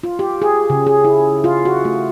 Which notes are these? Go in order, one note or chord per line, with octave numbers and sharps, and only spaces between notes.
F4
G4
G#4
C#3
G#4
E4
F4
F#4
A3